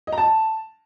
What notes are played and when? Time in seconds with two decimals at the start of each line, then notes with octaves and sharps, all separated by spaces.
0.07 D#5
0.12 A#5
0.18 A5